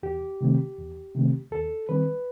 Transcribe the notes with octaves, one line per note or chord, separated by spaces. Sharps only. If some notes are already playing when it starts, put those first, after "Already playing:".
E2 G4
C3 D#3 A3 C4
E2
C3 D#3 A3 C4
D#2 A4
D#3 G3 C4 B4